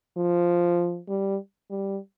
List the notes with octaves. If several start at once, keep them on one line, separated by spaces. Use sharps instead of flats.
F3
G3
G3